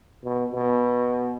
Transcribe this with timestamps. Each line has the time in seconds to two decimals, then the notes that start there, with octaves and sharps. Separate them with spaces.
0.25 B2
0.52 B2